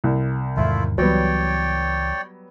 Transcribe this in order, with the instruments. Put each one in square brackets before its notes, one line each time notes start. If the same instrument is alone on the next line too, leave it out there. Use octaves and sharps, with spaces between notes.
[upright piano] C2
[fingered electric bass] E2 G#2 D#3 [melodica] A3 E4 F4
[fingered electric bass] C#2 E3 [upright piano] F#3 G3 B3 [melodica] C#5 D5 G5